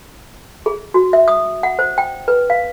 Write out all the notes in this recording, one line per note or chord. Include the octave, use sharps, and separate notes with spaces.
G#4
F#4
E5
D#6
F#5
C5
G5
B4
F5